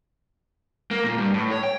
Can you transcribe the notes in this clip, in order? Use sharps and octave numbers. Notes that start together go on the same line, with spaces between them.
A#3
A#2
G2
A2
C#5
G5